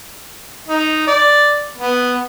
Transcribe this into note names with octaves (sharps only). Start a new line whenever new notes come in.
D#4
D5
B3